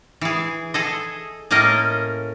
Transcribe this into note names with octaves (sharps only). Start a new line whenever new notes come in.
E3 G#4
G#4 A4 D#5
A2 A#3 C#4 A#4 D#5